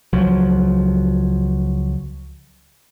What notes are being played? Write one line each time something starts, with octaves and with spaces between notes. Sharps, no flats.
C#2 F3 F#3